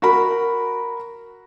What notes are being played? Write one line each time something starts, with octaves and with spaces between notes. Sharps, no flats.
F#4 A#4 B5